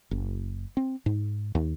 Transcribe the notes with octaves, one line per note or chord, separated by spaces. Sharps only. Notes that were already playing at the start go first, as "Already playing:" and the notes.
F#1
C4
G#2
D#2